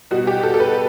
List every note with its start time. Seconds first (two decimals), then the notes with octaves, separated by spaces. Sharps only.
0.11 B2 G3 F#4
0.27 G4
0.43 A4
0.54 A4
0.60 B4